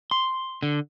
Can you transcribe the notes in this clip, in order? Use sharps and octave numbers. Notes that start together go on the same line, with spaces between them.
C6
D3